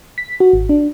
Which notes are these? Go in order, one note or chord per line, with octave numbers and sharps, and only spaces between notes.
B6
F#4
G#1
D4